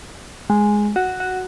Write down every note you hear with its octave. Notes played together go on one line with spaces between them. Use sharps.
G#3
F#4
F#4